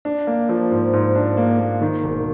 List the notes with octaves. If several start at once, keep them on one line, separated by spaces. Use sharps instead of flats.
D4
A#3
F3
G#2
G#2
D4
A#3
A#3
D#3
E1